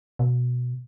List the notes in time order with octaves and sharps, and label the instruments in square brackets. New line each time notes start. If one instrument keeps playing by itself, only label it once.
[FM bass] B2